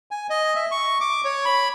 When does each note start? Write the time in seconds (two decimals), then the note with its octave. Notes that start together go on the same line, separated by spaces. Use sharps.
0.11 G#5
0.30 D#5
0.55 E5
0.71 C#6
1.01 D6
1.25 C#5
1.45 B5